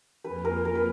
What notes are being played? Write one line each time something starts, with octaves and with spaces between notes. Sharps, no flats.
F2 F3 A#3 F4 B4
A#4
A#4
B4